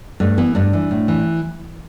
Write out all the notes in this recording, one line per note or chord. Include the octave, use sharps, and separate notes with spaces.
G2 A3
E3 B3
G2 D4
E3
A2
E3